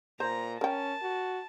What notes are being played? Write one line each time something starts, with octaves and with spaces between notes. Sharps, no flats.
A#2 C5 A#5
C#4 A#4 G5 A5
F#4